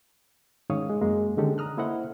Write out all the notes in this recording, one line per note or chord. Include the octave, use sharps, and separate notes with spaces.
G#2 D#3 C#4 C#5 F5 D#6
G#3
F#2 G#3 A#3
D3 D#3 G#3 C#4 G4 A4
A#5 D#6 F6 F#6
A#3 E4 A4 C5 D#5 F#5